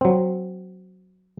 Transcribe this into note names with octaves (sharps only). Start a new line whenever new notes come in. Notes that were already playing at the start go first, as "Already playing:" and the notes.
F#3 C4